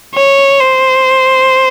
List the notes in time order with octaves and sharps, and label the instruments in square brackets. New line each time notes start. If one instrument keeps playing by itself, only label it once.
[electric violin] C#5
C5